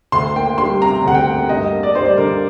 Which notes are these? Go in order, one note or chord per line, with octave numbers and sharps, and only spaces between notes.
D2 C6
A#3 G5
G3 C6
C3 A#5
D2 F#5
G5
A#3
G2 D#5
A#3
D5
G3 C5
D5
D3 A#4